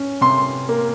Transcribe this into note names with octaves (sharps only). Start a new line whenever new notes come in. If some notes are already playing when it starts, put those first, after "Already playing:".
Already playing: C#4
C3 C6
A#3